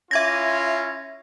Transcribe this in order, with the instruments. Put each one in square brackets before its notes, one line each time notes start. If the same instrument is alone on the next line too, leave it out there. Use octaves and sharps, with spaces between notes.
[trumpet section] C#4 E4 F4 [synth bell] E5 G#6 A#6